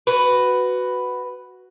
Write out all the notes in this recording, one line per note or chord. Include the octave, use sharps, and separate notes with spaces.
F#4 B4